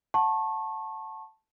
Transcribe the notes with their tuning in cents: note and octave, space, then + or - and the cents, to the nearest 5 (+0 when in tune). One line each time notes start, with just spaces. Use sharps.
F#5 +0 A5 +0 C#6 -30